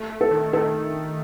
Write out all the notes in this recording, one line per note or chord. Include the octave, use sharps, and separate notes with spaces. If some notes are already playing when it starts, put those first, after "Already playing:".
Already playing: A3
A3
A4
D#3
D#3 A4